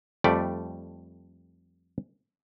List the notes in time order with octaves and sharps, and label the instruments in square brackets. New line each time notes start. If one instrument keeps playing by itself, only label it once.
[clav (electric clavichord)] F2 G3 A3 D5